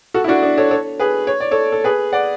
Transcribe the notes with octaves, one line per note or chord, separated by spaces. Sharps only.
F#4 A4
E4
D4 F#4
D4
A4 C#5
A4 C#5
G#4 B4
C#5
D5
A4 C#5
A4
G#4 B4
D5 F#5